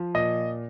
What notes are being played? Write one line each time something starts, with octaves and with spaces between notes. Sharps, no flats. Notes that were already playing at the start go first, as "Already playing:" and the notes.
Already playing: F3
A#2 D#5